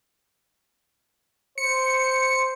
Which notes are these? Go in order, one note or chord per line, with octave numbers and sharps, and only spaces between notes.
C5 C#7